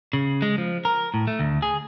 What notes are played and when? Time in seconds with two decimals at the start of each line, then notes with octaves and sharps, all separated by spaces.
0.13 C#3
0.42 G#3
0.58 F3
0.85 A#4
1.14 A2
1.27 A3
1.39 D2
1.62 G#4